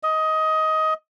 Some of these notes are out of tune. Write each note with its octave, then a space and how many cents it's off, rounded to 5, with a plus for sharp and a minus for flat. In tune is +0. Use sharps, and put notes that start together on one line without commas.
D#5 +15